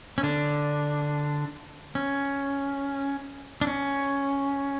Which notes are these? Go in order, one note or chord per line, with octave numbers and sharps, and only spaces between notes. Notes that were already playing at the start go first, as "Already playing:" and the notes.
C#4
D3 D4
C#4
D4
C#4